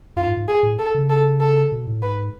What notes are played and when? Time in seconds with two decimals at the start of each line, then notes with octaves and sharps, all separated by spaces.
0.16 F#2 F4
0.27 G#2
0.37 G#2
0.48 G#4
0.63 A2
0.79 A4
0.95 C#3
1.10 A4
1.41 A4
1.72 B2
1.87 A2
2.02 G#2 B4